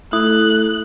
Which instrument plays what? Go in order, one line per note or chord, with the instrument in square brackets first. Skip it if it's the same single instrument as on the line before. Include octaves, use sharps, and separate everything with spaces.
[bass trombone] A3 [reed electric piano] E4 [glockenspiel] D#6 [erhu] F#6